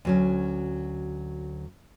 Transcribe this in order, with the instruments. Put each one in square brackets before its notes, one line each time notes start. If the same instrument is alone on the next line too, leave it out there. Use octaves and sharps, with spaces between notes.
[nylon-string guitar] D2 F#3 C#4